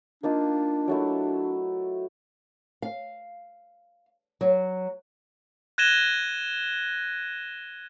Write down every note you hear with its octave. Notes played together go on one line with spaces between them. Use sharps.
A#3 D4 D#4 F4
F#3 A3 E4
F5
F#3
F#6 G#6 A#6 D#7 E7 G7